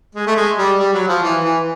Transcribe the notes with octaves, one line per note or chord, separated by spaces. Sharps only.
G#3
A3
G#3
G3
G3
F#3
F3
E3
E3